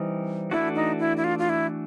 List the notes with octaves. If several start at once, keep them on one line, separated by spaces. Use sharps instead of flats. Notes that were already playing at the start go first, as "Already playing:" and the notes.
Already playing: E3 G3 C4 D#4
E3 A3 D4 E4 F#4
D#4
E4
E4
F4
F4
E4